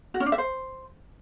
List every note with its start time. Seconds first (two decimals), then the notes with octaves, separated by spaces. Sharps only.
0.14 F#4
0.20 C#4
0.26 D4
0.32 E5
0.38 C5